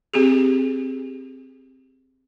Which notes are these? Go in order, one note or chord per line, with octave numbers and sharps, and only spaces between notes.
C4 G4 G#4